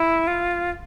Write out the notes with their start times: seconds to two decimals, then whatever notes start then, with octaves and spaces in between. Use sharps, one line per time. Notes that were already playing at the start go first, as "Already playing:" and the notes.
Already playing: E4
0.27 F4